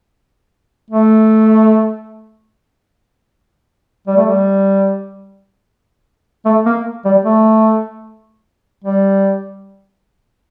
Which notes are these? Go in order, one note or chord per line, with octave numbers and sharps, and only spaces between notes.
A3
G3
A3
G3
A3
A#3
G3
A3
G3